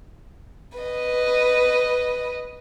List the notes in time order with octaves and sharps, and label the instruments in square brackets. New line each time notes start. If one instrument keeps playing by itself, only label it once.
[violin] B4 D#5